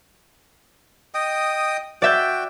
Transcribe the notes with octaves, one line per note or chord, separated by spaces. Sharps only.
D#5 G5 D#6
F#4 D5 E5 G5 G6